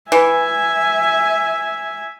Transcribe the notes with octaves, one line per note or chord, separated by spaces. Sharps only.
E3 E5 G#5